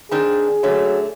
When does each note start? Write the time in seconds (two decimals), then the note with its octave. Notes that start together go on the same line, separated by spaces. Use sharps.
0.11 D#3 C4 D4 G#4
0.63 D3 F#3 A3